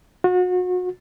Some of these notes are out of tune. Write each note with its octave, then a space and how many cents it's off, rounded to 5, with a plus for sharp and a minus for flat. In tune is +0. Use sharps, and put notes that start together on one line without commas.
F#4 -35